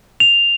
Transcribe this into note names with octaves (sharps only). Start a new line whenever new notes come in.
F7